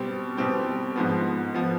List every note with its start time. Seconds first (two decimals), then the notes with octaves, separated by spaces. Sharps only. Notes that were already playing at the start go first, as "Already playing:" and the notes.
Already playing: B2 G3 C4 G4
0.37 B2 G3 C4 G4
0.96 G#2 F3 B3
1.54 F3 B3